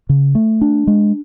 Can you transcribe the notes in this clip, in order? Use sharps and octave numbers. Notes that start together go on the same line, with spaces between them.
C#3
A3
D4
G#3